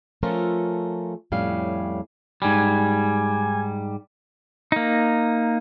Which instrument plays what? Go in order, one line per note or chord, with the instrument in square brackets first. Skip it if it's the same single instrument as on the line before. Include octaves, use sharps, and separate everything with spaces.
[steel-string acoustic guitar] F3 A3 C#4 F4 A4 A#4
F2 A2 G3 C#4 F5
[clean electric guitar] G#2 G3 [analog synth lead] G#5
[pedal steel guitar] A#3 D#4